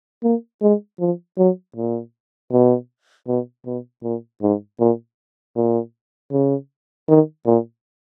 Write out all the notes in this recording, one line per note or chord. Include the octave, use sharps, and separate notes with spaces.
A#3
G#3
F3
F#3
A#2
B2
B2
B2
A#2
G#2
A#2
A#2
C#3
D#3
A#2